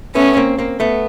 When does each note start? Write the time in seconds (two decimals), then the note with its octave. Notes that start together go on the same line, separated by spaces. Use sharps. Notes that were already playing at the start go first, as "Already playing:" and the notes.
0.15 A3 B3 C#4
0.37 A#3 C4
0.58 A#3 C4
0.80 A3 B3